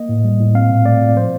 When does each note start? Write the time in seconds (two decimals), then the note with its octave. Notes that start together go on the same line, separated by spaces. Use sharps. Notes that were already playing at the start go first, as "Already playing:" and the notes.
Already playing: A#3 D#5
0.09 A2
0.24 G3
0.39 A2
0.55 C4 F5
0.70 A#2
0.85 A3 D5
1.01 A#2
1.16 F3 C5